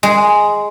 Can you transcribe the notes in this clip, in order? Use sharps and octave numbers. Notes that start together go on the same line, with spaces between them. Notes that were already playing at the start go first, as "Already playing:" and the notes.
G#3